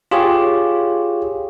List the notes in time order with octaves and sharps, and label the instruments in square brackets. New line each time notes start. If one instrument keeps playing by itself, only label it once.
[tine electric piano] F4 G4 G#4 C#5